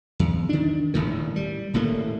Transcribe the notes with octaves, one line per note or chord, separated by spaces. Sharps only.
E2
D#3 D4
D#1 B1 A2 D#3
G3
D#1 A2 A3 A#3